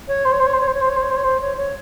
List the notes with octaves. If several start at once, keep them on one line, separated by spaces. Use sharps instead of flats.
C#5
C5
C#5
C5
C#5
C5
C#5
C5
C#5
C5
C#5
C5
C#5
C5
C#5
C5
C#5
C#5